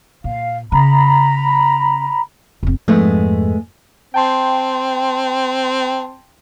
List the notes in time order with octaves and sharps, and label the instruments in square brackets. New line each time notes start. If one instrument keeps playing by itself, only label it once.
[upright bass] A#2 [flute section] F5
[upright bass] C#3 [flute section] A#5 B5
[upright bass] F1 C4
[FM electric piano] F2 G#2 [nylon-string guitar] G#3 A3 B3
[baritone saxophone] C4 [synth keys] G5 A5 C6